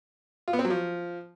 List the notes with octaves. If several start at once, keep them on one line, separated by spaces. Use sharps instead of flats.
F4
B3
C4
F#3
F3